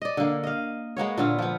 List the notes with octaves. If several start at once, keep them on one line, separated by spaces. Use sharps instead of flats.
D5 D#5
D3 A#3
D#5 F5
G#3 A#3 B3 C#5
A#2 D3 B3 F5
F3 B3